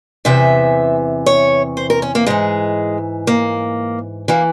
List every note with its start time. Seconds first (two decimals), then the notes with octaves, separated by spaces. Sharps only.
0.25 E2 C3 E3 E5
1.26 C#5
1.77 C5
1.90 A#4
2.02 C#4
2.15 A#3
2.27 G#2 E3 G#3
3.27 A#3
4.28 E3 A#3